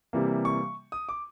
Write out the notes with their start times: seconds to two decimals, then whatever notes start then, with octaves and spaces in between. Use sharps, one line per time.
0.13 C3 E3 G3 A#3
0.45 C#6
0.92 D#6
1.09 D6